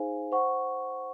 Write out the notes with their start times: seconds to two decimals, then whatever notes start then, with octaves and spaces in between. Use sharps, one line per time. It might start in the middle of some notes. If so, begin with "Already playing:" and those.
Already playing: D#4 G#4 C5 F5 G#5
0.32 C5 F#5 C#6